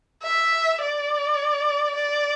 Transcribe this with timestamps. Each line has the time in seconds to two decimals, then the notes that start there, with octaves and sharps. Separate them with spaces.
0.23 E5
0.82 D5
1.95 D5